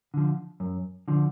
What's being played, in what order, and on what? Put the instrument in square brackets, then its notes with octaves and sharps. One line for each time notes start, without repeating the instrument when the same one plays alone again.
[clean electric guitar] D3 F3
F#2
D3 F3